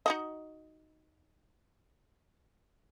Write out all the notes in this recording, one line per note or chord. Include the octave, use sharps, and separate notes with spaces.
D#4 F#4 D#5